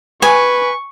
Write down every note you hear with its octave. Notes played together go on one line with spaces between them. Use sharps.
B4 G#5 C#6